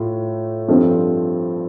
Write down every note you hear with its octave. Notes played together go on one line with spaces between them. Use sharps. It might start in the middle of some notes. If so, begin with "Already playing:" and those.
Already playing: A2 A3 F4
G2 F3 C4 A4